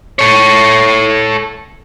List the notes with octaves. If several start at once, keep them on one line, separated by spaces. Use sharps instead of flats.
A4 C#5